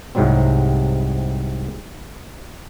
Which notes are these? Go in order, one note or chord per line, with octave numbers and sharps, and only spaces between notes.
C2 G#2 C3 F#3 G3 C4